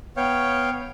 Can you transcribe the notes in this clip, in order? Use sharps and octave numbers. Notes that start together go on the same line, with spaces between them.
B3 C#5 F5 G5